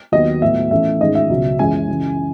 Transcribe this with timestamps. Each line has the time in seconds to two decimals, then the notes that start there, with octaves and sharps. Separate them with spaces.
0.12 D#2 D#3 F#3 B3 D#5
0.42 A2 F#3 B3 E5
0.71 A2 E3 A3 C#4 E5
1.01 G#2 D#3 G#3 C#4 D#5
1.15 E5
1.30 C#2 B2 F#3 C#4
1.59 F#2 E3 G#3 C#4 G#5
1.88 F#2 C#3 E3